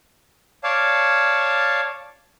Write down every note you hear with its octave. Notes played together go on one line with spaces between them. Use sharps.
C#5 D5 F5 A5